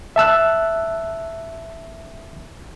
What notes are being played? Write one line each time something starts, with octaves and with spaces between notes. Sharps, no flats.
E5 A5 E6 F#6